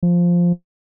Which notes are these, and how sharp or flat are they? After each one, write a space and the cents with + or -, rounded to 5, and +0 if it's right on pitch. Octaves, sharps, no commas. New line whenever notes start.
F3 +0